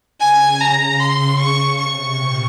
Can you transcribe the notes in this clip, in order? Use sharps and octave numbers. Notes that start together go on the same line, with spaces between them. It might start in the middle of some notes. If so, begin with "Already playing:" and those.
C#3 G#5
A#5
C6
C#6
C3 C#6
A#2